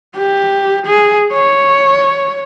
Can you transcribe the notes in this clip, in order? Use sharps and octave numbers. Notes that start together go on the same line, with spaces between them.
G4
G#4
C#5